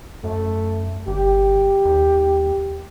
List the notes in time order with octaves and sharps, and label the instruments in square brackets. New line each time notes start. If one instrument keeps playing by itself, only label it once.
[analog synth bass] F#2 [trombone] A3
[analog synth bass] G1 [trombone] G4
[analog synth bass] D#2